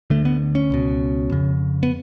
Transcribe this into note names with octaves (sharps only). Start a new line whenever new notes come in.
D2 D3 A3
B3
C#4
C#2 B2
F2 C#3
B3